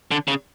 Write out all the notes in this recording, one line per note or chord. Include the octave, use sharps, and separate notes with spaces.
D3
C#3